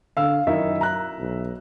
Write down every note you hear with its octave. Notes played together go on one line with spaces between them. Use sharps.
D3 F5 E6
F#2 D#3 D#4 E4 E5
A#5 F#6
B1